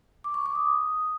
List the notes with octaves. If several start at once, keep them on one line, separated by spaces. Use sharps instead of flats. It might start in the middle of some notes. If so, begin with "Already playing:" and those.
D6
C#6
D6
D#6